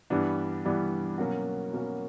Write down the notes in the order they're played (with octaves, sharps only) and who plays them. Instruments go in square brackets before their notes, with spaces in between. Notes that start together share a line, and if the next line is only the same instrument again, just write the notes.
[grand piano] G2 E3 G3 B3 D4
G2 E3 G3 B3 D4
B2 F#3 A#3 C#4 F#4
B2 F#3 A#3 C#4 F#4